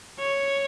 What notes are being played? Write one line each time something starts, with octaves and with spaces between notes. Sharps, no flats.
C#5